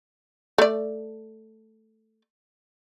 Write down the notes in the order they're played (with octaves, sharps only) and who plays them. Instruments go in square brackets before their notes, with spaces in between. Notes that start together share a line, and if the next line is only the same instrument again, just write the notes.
[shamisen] A3 D5